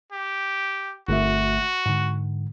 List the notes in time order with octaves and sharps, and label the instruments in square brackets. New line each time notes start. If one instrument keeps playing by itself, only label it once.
[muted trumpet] G4
[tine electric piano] G1 A3 E5 [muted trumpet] F#4
[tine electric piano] G#2 D3